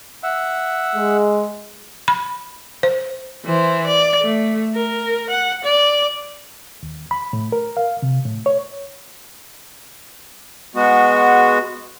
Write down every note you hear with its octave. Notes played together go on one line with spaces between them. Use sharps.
E5 F#5
G#3
B5
C5
E3 C5
D5
A3
A#4
F#5
D5
D#2
B5
A2
A#4
F5
C3
A2
C#5
G#3 B3 F#4